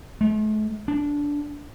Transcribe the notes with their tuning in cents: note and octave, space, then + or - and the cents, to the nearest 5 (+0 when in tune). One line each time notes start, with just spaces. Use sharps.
A3 -45
D4 -15